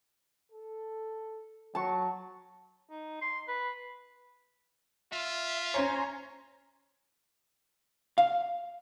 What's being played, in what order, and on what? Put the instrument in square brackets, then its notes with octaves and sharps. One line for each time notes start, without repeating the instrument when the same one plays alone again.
[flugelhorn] A4
[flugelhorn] F#3 [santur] A5 C#6
[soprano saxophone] D#4
C6
B4
[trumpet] F4 [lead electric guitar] E5
[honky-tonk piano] C#4 C5 C#5 [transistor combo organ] G#5 A#5 C6
[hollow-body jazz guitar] F5